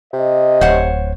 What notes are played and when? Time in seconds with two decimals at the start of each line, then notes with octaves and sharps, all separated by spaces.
0.14 C3 D#5
0.61 D1 C5 C#5 F#5